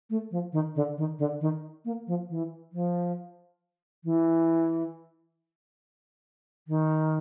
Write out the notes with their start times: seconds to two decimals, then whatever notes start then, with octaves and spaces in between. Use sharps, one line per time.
0.10 A3
0.31 F3
0.53 D#3
0.75 D3
0.97 D#3
1.19 D3
1.41 D#3
1.85 A#3
2.07 F3
2.29 E3
2.72 F3
4.04 E3
6.68 D#3